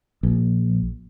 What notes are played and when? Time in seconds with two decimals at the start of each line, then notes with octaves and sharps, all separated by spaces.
0.23 A#1